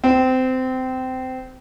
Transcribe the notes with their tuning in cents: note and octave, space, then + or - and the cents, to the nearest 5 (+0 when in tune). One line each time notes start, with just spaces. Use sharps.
C4 -20